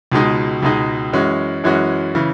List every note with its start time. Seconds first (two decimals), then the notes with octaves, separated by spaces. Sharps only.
0.12 C#2 B2 G#3 D#4
0.62 C#2 B2 G#3 D#4
1.13 F#2 E3 G#3 C#4 F#4
1.64 F#2 E3 G#3 C#4 F#4
2.15 C#3 E3